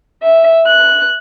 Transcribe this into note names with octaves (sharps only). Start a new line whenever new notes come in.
E5
F#6